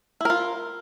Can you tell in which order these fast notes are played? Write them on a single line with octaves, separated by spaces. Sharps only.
E4 A#4 F4